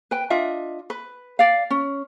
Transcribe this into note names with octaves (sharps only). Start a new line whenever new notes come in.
B4 G5
D4 F4 D#5 E5
B4
D5 F5
C#4